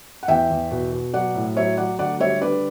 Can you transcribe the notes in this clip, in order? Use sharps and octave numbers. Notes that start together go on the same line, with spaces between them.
F#5
E2 E5 G5
E2
B2
B2
F#3 D5 F#5
A2
F#3 C#5 E5
F#3 D5 F#5
D2 D5 F#5
G3 C#5 E5
D3 B4 D5